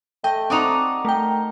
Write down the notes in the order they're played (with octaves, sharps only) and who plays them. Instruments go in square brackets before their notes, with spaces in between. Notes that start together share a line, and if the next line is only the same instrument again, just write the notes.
[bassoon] A3 [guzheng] D#5 [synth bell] G5
[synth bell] C4 D#6 F7 [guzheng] D#4 F#4 D5
[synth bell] A3 G5 [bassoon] A#4